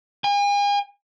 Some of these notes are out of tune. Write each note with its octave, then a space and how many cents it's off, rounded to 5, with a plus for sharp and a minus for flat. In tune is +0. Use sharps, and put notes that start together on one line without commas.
G#5 -40